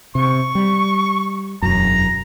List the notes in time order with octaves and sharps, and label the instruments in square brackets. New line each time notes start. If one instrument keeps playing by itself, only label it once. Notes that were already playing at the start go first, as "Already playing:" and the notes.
[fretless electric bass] C3 [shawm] C#6
[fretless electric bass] G3
[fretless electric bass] E1 F#2 [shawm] A#5